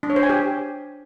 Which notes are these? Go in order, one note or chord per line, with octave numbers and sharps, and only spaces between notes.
D4
C#5
C5
G#5
G4